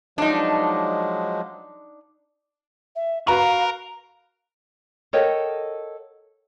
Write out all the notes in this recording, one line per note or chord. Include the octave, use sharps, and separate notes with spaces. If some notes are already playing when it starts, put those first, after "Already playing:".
F3 F#3 G#3 D4 D#4
E5
F#4 A#4 B4 F5 A#5
A4 A#4 C#5 D#5 F#5 G5